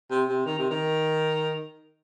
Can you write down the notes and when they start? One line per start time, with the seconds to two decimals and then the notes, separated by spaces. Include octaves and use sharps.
0.10 C3
0.29 C3
0.46 D#3
0.59 C3
0.70 D#3